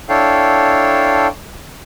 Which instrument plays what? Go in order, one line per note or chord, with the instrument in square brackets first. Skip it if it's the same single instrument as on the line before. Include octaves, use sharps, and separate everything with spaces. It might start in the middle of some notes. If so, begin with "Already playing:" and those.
[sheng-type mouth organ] D4 E4 A4 C#5 F5 G5